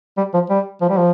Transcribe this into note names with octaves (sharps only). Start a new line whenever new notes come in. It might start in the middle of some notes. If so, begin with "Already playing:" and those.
G3
F3
G3
F3
G3
F3